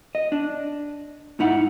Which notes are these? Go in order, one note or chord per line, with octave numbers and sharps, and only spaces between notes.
D#5
D4
G#2 D#4 E4 F#5